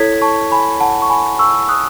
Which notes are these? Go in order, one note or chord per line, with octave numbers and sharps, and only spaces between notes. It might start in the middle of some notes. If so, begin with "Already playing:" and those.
Already playing: E4 A4 C#5 G#6 B6
A5 C#6
G#5 B5
F#5 A5
C#6
G#5 B5
C#6 E6
D#6 F#6